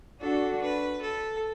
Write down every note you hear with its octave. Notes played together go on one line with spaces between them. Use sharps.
D4 F#4 A4
B4
A4